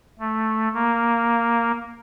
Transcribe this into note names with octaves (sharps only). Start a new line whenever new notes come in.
A3
A#3